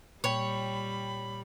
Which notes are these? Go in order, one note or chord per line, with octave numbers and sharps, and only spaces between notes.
A#2 G3 C#5 G5 B5